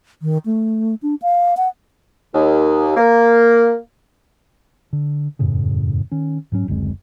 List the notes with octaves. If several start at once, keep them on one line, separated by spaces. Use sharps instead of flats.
D#3
A3
D4
F5
F#5
D#2
A#3
D3
E1 F#2 A2 C#3
D#3 C#4
G#2 F#3 C#4
F#1 D2 G#3 C4